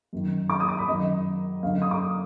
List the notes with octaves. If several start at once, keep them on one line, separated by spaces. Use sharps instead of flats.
F#2 D#3
D6
D#6
D6
B5
F#2 D#3 D#5
F#2 D3 F5
D#6
D6